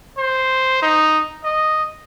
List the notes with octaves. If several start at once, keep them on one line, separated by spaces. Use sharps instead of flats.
C5
D#4
D#5